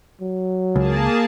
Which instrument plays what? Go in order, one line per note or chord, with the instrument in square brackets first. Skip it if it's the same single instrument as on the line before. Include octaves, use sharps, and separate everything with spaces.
[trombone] F#3
[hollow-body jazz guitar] C#2 [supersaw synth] A#3 G#4 A5